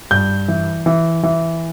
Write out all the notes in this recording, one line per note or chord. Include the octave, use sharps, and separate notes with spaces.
G2 G6
E3
E3
E3